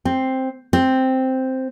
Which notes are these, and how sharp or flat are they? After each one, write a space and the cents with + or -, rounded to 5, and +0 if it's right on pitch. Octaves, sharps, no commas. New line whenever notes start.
C4 +5
C4 +0